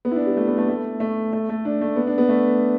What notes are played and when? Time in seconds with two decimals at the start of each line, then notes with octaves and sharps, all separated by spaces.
0.05 B3
0.11 E4
0.15 D4
0.26 G3
0.37 A3
0.48 B3
0.58 A3
0.68 A3
1.00 A3
1.33 A3
1.49 A3
1.65 D4
1.81 A3
1.96 B3
2.07 D4
2.18 B3
2.29 A3